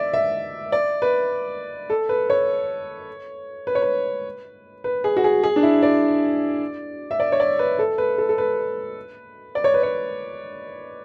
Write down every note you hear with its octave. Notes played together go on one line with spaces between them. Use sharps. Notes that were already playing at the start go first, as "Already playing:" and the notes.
Already playing: D5 E5
E5
D5
B4
A4
B4
C#5
B4
C#5
B4
B4
G#4
F#4
G#4
G#4
D4
E4
D5
E5
D5
C#5
D5
B4
A4
B4
A4
A4
B4
D5
C#5
B4
C#5